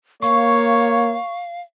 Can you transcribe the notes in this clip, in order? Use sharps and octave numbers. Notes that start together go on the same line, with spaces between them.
A#3 C#5 F5 C#6